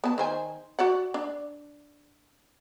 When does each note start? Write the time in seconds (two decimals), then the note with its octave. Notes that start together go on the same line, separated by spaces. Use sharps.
0.04 B3 A5
0.18 D#3 C5 G#5
0.79 F#4 D5 F#5
1.14 D4